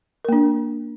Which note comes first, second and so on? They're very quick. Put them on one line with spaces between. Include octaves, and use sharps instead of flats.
A#4 A#3 D4